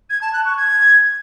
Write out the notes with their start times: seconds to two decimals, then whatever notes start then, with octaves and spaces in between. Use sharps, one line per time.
0.10 G#6
0.21 A5
0.33 F#6
0.45 C#6
0.56 G#6